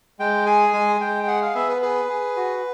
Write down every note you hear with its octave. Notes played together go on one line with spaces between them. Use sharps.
G#3 G5
G#4 G#5
G#3 G#5
G#3 G5
G5
G#4 F#5
F5
B3 E5
B4
G#4 B4
G#4
F#4